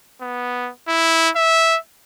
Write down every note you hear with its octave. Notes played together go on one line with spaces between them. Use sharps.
B3
E4
E5